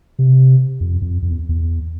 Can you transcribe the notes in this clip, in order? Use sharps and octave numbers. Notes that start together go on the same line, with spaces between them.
C3
F2
F2
F2
E2
E2